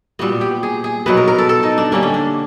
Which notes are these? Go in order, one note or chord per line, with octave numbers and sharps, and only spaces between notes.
A#2 G3 B3 F#4
G4
G#4
G#4
B2 F#3 B3 B4
A#4
A#4
A4
A4
D#4
D4
D3 G3 A#3 C#4
C#4
D4